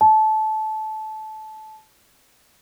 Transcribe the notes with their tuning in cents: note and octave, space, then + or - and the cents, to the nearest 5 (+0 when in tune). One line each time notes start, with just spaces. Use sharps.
A5 -20